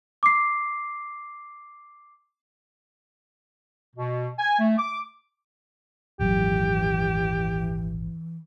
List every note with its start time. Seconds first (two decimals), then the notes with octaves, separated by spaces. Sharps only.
0.23 D6 C7
3.96 B2
4.39 G#5
4.59 A3
4.78 D6
6.19 D#1 G#1 E3 F#3 G4